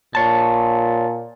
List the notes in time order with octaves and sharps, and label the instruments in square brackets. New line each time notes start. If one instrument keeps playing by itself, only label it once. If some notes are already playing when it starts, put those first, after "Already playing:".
[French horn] A#2 [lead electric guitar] C#5 A5